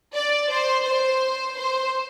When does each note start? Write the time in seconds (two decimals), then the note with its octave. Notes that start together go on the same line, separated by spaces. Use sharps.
0.14 D5
0.49 C5
0.84 C5
1.56 C5